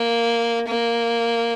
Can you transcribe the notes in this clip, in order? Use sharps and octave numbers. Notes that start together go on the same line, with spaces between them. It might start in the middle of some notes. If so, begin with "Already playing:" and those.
Already playing: A#3
A#3